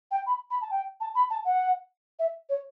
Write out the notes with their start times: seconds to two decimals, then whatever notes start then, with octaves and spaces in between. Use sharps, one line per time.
0.11 G5
0.26 B5
0.51 B5
0.61 A5
0.70 G5
1.00 A5
1.15 B5
1.30 A5
1.45 F#5
2.19 E5
2.49 C#5